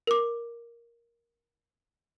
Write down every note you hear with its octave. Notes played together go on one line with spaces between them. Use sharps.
A#4 D6